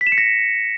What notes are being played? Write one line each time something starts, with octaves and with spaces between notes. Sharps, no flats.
B6
E7
C#7
A#6